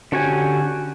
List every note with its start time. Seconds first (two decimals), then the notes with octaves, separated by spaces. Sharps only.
0.12 D3 C#4 F#4 G4 G#5